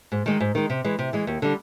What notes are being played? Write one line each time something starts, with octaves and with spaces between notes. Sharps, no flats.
G#2
D#3 G#3
G#2
D#3 G#3
C3
E3 G#3
C3
E3 G#3
D#2
D3 G3